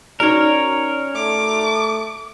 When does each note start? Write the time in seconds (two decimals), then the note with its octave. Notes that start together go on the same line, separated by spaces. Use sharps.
0.20 C#4 D#4 F#4 A#4 C#5 D5
1.15 A3 D6